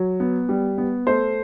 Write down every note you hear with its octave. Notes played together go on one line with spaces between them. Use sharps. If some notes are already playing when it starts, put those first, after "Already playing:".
Already playing: F#3
B3
G3
B3
A3 C5